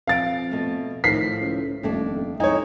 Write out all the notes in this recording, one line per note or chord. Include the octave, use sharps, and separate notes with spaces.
F2 F5 A6 D7
B2 A3
A2 D#3 F3 B6 C7
C#2
D#1 F2 A3 D4
F2 G#2 D#4 E4 C#5 G#5